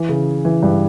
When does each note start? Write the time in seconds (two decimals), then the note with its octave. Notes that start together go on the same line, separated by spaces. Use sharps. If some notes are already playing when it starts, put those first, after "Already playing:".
Already playing: E3
0.09 C#3
0.45 E3
0.63 G2